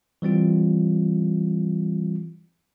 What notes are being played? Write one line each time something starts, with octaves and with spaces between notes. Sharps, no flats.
E3 G3 C4 F4